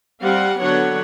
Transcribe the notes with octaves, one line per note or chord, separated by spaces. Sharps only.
G3 C4 F5 F#5
D3 F#3 B3 D4 C#5 F#5